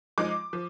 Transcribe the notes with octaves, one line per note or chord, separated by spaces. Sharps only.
F3 G#3 D#4 D6
F3